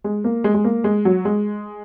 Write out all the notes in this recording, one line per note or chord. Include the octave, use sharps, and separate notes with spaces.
G#3
A#3
G#3
G#3
A#3
G#3
F#3
G#3